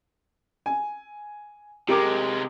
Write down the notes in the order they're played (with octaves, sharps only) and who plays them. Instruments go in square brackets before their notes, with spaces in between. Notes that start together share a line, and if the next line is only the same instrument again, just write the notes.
[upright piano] G#5
[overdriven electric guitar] C3 G#3 [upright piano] G4 A#4 D6